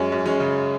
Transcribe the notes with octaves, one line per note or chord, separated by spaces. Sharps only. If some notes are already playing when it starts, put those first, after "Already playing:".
Already playing: F#2 G#3 C#4
F#2
G#3 C#4
C#3